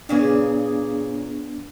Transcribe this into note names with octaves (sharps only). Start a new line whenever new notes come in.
A#2 C#3 B3 D4 G#4